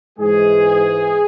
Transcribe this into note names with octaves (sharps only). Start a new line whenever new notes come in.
G#2 E3 G#3 G#4